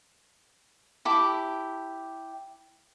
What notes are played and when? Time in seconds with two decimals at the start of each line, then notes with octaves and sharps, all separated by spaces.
1.05 E4 G4 A5 D6